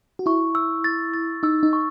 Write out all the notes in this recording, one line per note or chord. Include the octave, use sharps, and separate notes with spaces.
F#4
E4 C#6
E6
A6
A6
D#4 E6
D#4
C#6